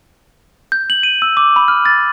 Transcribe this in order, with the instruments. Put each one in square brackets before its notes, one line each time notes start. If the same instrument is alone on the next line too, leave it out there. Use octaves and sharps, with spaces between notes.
[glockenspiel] G6
F#7
D#7
E6
D6
B5
F6
A6